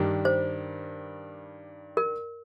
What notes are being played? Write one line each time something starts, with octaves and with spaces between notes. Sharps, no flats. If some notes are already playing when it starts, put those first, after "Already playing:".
Already playing: G2 D#3 G3 D4
C5
A#4